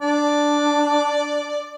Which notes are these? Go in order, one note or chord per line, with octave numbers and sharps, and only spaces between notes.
D4 D5